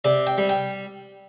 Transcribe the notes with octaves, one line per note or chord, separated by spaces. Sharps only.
C3 D5
G5
G3
G5